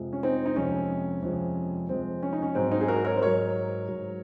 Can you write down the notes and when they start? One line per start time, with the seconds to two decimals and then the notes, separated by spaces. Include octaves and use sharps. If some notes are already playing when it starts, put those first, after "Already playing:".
Already playing: F2 C3 F3 G#3
0.13 C#4
0.23 C4 D#4
0.46 D#4
0.56 F2 C3 F3 G#3 C#4
1.22 F2 C3 F3 G#3
1.88 F2 C3 F3 G#3 C4
2.23 C#4
2.33 D#4
2.42 C#4
2.55 G#2 F#3 C4
2.71 C4 D#4
2.81 G#4
2.88 F#4 A#4
3.05 A#4 C#5
3.16 C5
3.22 G#2 F#3 A#4 C#5
3.88 G#2 F#3